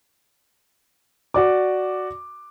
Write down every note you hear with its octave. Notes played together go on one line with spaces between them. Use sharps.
F#4 D5 D6